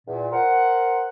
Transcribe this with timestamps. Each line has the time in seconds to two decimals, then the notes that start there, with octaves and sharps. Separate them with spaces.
0.07 E2 A#2
0.32 A#4 C5 F#5